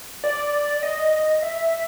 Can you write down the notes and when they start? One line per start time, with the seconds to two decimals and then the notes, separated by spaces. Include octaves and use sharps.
0.24 D5
0.83 D#5
1.42 E5